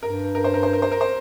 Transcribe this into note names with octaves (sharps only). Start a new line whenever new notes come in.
G2 A#4
A#4
C5
A#4
C5
A#4
C5
A#4
C5